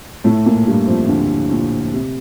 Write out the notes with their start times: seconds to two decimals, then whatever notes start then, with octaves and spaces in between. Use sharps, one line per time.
0.24 A2 A3
0.46 A#2 A#3
0.67 G2 G3
0.87 F2 F3
1.08 D2 D3
1.51 A#2
1.93 C3